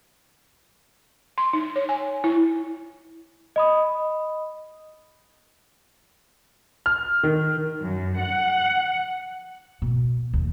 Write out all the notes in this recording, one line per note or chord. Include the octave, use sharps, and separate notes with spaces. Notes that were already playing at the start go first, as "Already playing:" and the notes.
C6
D#4
C#5
G#5
E4
D#5 B5 D#6
F6
D#3
F#2
F#5
B2
D#2